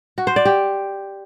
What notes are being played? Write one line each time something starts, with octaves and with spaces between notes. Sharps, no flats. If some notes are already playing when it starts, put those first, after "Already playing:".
F#4
C5
D5
G4